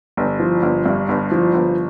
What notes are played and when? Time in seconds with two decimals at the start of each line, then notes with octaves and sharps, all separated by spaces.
0.17 G1
0.40 F3
0.63 G1
0.86 G2
1.09 G1
1.32 F3
1.54 G1